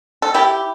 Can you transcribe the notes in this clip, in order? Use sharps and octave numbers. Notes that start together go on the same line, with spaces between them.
A4
E4 G4